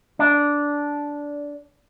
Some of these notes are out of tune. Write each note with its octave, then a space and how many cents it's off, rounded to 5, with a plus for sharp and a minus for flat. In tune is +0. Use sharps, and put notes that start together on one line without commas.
D4 -10